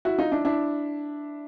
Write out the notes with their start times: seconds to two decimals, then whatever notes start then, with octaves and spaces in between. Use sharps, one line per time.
0.05 E4 F#4
0.19 D#4 F4
0.32 D4 E4
0.45 D4 E4